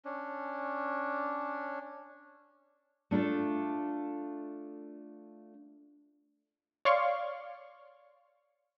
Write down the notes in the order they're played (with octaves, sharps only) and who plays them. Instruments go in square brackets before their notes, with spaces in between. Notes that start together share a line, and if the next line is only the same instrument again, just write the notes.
[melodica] C#4 D4
[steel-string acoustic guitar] A3 D4 F4 A4
[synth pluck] C#5 D5 F5 C6 C#6